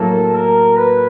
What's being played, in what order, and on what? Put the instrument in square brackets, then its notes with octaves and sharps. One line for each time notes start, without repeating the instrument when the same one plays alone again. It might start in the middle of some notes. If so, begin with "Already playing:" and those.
Already playing: [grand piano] A2 F#3 A#3 [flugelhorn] A4
[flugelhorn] A#4
B4